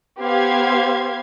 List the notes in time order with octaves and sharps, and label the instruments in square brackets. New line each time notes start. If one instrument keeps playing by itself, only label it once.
[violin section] B3 G4 C5 F5 C6 G#6